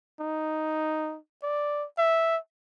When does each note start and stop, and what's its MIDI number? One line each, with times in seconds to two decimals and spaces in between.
0.20 1.18 63
1.43 1.85 74
1.98 2.37 76